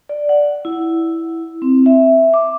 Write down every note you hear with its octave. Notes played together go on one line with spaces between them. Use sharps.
D5
F#5
E4
C4
E5
D6